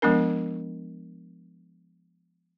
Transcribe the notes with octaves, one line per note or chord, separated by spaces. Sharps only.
F3 G#3 B3 D4 A#4